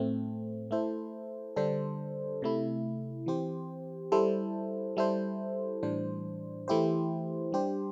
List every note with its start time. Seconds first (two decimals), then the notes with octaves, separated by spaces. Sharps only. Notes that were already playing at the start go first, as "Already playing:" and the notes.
Already playing: A2 A3 C4
0.71 A3 E4 A4 C5
1.56 D3 G3 D4 A4 C5
2.42 C3 A3 E4
3.26 E3 C4 G4 C5
4.12 G3 E4 A4 C5
4.97 G3 E4 A4 C5
5.83 A2 E3 G3 D4 C5
6.68 E3 A3 E4 G4 C5
7.52 G3 D4 G4 C5